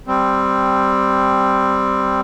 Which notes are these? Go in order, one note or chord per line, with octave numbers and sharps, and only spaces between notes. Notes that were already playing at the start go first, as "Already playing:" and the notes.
G3 C4